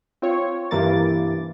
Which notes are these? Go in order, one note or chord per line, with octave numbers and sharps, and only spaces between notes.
C4 F4 C#5
G2 C3 E3 A#3 D6 A6